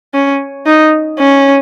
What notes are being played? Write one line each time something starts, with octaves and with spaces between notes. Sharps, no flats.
C#4
D#4
C#4